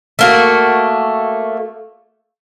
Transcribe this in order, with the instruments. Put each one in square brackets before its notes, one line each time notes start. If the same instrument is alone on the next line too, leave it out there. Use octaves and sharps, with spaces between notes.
[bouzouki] A3 A#3 F#4